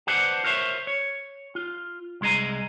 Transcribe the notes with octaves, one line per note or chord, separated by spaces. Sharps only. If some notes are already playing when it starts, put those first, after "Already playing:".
B4 C5 D5 F#5 A5
A#4 C5 C#5 E5
C#5
F4
C2 G#3 G#4 D#5 A#5